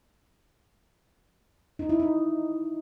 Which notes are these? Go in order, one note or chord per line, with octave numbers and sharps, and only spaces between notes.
D#4
E4
D#4